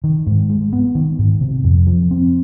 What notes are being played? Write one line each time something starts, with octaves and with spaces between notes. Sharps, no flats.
D#3
G#2
G#3
B3
D#3
G#2
C3
F2
F3
C4